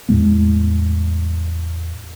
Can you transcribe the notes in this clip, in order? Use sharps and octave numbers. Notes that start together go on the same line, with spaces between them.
E2 A2 G#3 B3